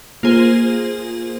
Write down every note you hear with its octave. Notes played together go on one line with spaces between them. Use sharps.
A#3 F4 G#4 C5